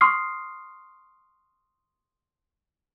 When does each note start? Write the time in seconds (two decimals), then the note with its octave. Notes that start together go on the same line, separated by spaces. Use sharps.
0.01 C6 C#6 D#6 F6 C7